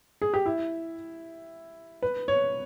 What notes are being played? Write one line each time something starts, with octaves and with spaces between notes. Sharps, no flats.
G#4
G4
E4
B4
C#5